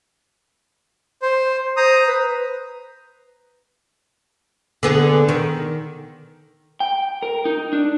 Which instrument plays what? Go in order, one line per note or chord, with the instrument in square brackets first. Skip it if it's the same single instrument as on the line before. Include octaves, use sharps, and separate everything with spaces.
[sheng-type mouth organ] C5
[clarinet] C5 [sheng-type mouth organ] A#5 D#6
[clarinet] B4
[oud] D3 B3 G#4
D#3
[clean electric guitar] G5
A#4
D#4
D4